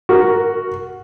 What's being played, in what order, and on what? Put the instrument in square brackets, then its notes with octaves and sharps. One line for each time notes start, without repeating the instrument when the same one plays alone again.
[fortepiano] F#4 A#4